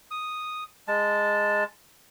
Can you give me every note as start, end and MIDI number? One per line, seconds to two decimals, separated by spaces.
0.11 0.64 87
0.88 1.64 56
0.88 1.64 81